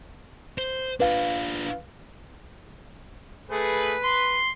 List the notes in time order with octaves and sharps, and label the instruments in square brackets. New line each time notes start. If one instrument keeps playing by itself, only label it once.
[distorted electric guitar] C5
[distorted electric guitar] D4 F4 [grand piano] B4 F5
[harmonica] A3 G#4 [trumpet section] B4
[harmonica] C6